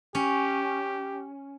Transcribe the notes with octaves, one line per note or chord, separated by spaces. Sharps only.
C#4 G4